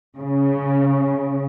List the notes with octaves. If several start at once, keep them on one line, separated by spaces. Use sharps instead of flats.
C#3